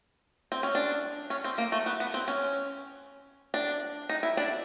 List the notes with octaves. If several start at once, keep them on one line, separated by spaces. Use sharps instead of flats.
C4
C#4
D4
C#4
C4
A#3
A3
B3
B3
C4
C#4
D4
D#4
E4
D4